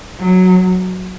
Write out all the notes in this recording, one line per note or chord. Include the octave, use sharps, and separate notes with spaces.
F#3